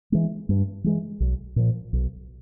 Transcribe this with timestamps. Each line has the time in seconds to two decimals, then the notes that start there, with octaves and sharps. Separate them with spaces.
0.12 E3 G#3
0.49 G2
0.84 E3 G#3
1.20 B1
1.56 A#2 F3
1.93 B1